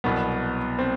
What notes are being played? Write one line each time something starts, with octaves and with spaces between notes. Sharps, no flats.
C2 B2 F#3 B3
C4